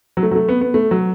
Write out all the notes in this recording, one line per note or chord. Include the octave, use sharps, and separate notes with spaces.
F#3
A3
F#3
A3
B3
B3
A3
F#3